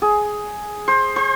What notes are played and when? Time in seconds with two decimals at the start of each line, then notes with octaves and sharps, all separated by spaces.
0.02 G#4
0.88 C5
1.16 C5